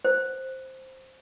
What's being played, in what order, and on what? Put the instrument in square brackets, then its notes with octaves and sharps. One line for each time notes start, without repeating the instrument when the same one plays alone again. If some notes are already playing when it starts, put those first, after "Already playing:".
[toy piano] C5